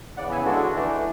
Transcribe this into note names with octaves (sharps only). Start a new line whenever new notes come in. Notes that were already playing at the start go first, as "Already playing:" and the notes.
C#3 E3 B3 D5 F#5
E5 G#5
D3 G#3 D4 F#4 A4
E3 A3 D4